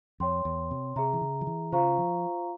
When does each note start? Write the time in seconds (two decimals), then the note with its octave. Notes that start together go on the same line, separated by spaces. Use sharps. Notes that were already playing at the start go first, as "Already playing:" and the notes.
0.20 F2 C#5 G5 C6
0.45 E2
0.71 C3
0.96 C3 G#4 E5 A#5
1.13 E3
1.21 C#3
1.41 F3
1.47 E3
1.72 C#3 F4 C5 F5 A#5 C#6
1.98 F3